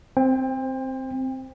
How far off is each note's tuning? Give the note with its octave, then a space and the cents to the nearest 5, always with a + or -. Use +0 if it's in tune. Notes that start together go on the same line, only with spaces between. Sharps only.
C4 +0 C5 +0 G5 +35